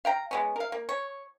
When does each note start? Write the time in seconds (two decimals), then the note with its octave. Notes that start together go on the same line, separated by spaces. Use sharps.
0.05 F5 G5 A#5
0.31 G#3 B3 C#4
0.56 A#4 F5
0.72 A#3
0.89 C#5